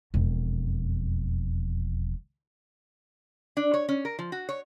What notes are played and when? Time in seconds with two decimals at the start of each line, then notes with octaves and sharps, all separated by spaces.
0.14 E1 F2
3.57 D4
3.74 C#5
3.89 C#4
4.05 A#4
4.19 F3
4.32 F#4
4.49 C#5